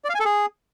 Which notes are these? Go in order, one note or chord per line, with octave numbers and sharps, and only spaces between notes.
D5
F5
G#5
A4
G#4